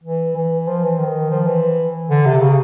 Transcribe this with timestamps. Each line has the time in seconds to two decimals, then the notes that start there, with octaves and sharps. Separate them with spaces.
0.03 E3
0.36 E3
0.67 F3
0.83 E3
0.98 D#3
1.31 F3
1.46 E3
2.10 D3
2.25 C3
2.41 C#3